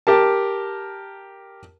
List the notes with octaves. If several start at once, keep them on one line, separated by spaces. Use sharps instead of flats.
G4 A#4 A5